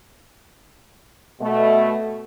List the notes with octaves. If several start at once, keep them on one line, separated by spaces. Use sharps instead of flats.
B2 A3